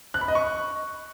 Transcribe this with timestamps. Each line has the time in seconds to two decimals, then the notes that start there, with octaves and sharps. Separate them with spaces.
0.14 F#6
0.21 B5
0.28 D#5
0.35 C#6